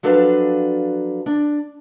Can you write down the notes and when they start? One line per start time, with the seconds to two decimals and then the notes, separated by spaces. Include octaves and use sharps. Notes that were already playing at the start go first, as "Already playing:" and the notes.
0.03 F3 F#3 D4 A4 B4 F5
1.26 D4